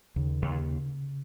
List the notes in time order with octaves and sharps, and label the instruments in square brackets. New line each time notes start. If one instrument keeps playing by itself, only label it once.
[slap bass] D#2 [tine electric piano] C#3
[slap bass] D#2